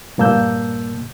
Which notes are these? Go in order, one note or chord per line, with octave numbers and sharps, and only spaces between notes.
G2 A#2 A#3 A5 E6 G6